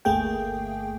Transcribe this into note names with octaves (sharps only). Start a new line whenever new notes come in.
G1 D2 A3 A#3 G#4 G5